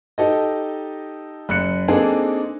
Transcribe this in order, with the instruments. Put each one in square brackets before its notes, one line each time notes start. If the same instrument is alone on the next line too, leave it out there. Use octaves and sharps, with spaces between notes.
[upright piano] D#4 G4 A4 D#5
F#1 F#6 C#7
A#3 C4 D4 D#4 G#4 A4